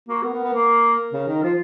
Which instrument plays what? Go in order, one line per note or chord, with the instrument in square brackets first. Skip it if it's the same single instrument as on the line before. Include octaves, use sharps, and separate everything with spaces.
[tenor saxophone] A#3 [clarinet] F#4
[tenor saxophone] B3 [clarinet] A#4
[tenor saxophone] B3
B3
A#3
C#3
D#3
[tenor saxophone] F3 [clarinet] F4